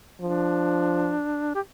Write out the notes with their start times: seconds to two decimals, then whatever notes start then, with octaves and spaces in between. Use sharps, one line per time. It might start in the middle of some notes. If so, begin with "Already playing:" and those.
0.21 F3 D4
1.55 G4